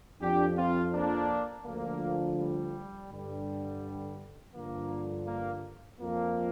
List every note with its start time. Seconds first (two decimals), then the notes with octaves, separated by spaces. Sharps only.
0.22 F2 F3 D4 G4
0.57 C4 F4
0.94 A#3 D4
1.66 D2 D3 F3 A#3
2.39 G3
3.11 G2 D3 G3
4.55 G2 D3 F3 A#3
5.27 A#3
6.00 F2 F3 A#3